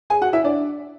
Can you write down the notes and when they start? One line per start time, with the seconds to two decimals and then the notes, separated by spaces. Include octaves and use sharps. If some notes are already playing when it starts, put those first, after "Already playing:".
0.10 G#4 G#5
0.21 F#4 F#5
0.33 E4 E5
0.44 D4 D5